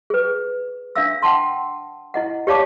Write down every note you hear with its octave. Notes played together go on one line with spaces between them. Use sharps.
G#4 B4
D4 E5 F5 E6
F#5 G5 A5 C6
E4 D#5 F#5
G4 C#5 D5 F5 A5 D6